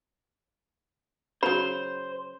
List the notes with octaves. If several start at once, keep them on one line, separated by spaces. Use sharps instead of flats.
C#3 F#3 C5 B5